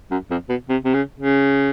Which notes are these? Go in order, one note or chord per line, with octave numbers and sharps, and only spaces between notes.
F#2
F2
B2
C3
C3
C#3
C#3